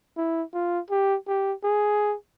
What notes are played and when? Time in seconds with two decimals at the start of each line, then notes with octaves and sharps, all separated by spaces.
0.17 E4
0.54 F4
0.90 G4
1.28 G4
1.64 G#4